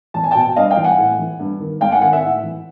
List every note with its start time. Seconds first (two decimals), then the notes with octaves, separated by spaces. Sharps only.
0.14 E2 A5
0.24 G#5
0.31 G5 A5
0.35 B2
0.56 G2 D#5 F5
0.70 F5 G5
0.77 E3
0.84 F#5 G#5
0.98 A2
1.19 E3
1.40 G2
1.60 D#3
1.81 G#2 F5 G5
1.91 F#5 G#5
2.01 D#3 F#5 G#5
2.12 E5 F#5
2.23 A2
2.43 E3